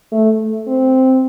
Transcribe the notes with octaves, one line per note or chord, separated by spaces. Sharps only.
A3
C4